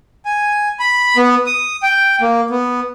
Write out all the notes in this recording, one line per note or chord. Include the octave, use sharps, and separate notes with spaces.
G#5
B5
B3
D#6
G5
A#3
B3